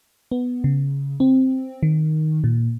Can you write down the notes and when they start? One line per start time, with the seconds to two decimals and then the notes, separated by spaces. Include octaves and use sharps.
0.32 B3
0.64 C#3
1.20 C4
1.83 D#3
2.44 A#2